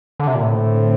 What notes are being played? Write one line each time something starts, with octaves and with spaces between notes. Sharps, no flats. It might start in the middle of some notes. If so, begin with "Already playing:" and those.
D3
C3
A#2
A2 D3 A3 C4